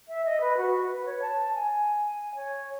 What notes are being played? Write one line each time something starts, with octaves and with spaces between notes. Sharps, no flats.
E5
D#5
B4
F#4
B4
C#5
A5
A5
G#5
C#5